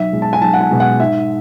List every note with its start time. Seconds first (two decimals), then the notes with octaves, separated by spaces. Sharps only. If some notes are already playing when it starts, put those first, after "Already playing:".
Already playing: B1 E5
0.12 B2 G#3
0.22 A5
0.33 G#5
0.41 B1 A5
0.53 F#5
0.61 G#5
0.71 B2 G#3
0.80 F#5
1.00 G#2 E5